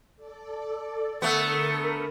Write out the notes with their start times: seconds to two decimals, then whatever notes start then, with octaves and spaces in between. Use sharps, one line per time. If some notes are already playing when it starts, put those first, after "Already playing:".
0.16 A4 D5
1.22 D3 A3 B3 A4 A#4